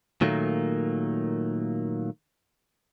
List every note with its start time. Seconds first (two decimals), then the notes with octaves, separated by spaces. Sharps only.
0.21 A#2 D#3 F#3 A3 A#3